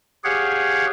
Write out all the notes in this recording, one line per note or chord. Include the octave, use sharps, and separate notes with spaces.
G4 G#4 C#5 F5 F#5